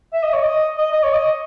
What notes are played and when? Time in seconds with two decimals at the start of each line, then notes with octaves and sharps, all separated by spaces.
0.13 E5
0.23 D#5
0.33 C#5
0.42 D#5
0.77 D#5
0.92 D#5
1.03 C#5
1.13 D#5